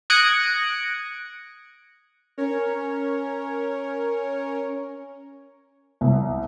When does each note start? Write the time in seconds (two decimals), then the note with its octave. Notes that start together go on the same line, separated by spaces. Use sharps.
0.10 D#6 F#6 G#6 A#6 C#7 D7
2.38 C#4 A#4 C#5
6.01 C2